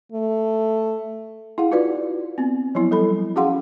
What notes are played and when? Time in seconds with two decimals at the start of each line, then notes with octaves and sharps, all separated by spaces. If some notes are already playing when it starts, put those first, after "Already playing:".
0.12 A3
1.58 E4 G#4 F5 F#5
1.71 D#4 F4 F#4 B4 D5
2.38 B3 C4
2.75 F3 F#3 B3 E4
2.91 G3 A4 B5
3.36 C#4 F#4 G#4 F5 F#5 C6